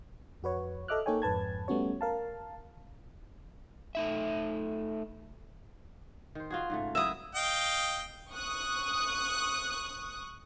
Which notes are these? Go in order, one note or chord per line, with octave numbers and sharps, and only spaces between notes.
F2 F#4 B4 C#5
A4 D#5 E5 D6 F6 F#6
A#3 D#4 A4 C#5 G5 G#5
F2 G#2 B4 A5 G#6
G3 A3 B3 C#4 F#4 C#5
A#4 F5 A5
A3 D#4 E5
D#3 C5
F4 F#4 G#4
G#2 C#3 A3
F#3 E4 E5 D#6
D#5 F5 G5
C#6 D#6 F#6